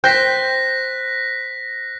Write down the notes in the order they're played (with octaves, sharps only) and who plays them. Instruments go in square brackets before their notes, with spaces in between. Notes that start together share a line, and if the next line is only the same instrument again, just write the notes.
[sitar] C5 [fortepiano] G5 [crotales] F#6 A#6 B6